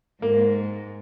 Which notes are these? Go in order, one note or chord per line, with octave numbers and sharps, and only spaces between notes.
G#2 A#3